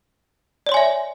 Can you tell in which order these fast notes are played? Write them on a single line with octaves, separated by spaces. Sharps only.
D5 C#5 C6 G#5 E5